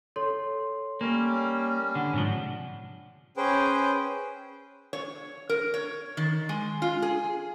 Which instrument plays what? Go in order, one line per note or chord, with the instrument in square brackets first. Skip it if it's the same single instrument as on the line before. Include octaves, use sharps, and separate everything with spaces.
[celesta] A4 C#5 C6
[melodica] G3 C#4 [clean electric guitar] A#3
[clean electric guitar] D3 [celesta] F#5
[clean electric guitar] G#2 C3 F3
[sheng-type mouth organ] C#4 G#4 B4 C5 G5
[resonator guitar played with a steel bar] C#5
A#4
C#5
D#3
G#3
F4
G#4